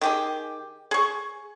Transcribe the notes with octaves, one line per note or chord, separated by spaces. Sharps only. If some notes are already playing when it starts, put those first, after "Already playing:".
D#3 G4 G#4
G#4 C#6